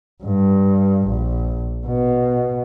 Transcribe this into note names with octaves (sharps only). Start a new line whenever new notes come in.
G2
A#1
B2